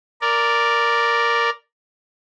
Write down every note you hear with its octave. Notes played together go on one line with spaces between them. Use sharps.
A#4 D5